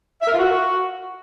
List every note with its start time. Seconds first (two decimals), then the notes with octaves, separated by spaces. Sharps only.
0.22 E5
0.27 A#4
0.33 F4
0.38 F#4